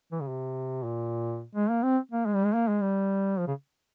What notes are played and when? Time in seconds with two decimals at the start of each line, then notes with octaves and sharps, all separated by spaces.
0.12 E3
0.21 C#3
0.28 C3
0.85 A#2
1.55 G#3
1.70 A#3
1.83 C4
2.12 A#3
2.26 G#3
2.35 G3
2.45 G#3
2.54 A#3
2.68 G#3
2.82 G3
3.39 F3
3.47 C#3